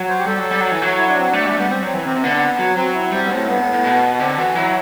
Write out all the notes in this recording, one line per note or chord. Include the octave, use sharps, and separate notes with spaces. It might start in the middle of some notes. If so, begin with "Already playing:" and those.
Already playing: F#3
C5
G4
G3 A4
F#3
G3
F#3
E3
F#3
E4
D4
C4
A3 D4
G3
A3
G3 B3
G3 C4
F#3
C4
E3
C3 C4
C3
D3 B3
F#3
F#3 C4
E4
G3 C4
B3
A2 C4
G2 B3
A2
A2
B2
D3 C4
E3 F#4
F#3 E4